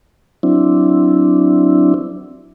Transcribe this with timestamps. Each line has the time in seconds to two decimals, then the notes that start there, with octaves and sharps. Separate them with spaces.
0.43 F#3 C4 D4 E4